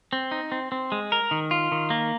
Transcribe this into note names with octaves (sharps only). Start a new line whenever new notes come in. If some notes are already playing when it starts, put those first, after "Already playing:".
C4
D#4
C4
C4
G#3
A#4
D#3
F4
D#3
A#3